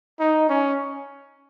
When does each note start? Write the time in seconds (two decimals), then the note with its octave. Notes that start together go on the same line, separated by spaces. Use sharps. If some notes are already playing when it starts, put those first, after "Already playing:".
0.20 D#4
0.49 C#4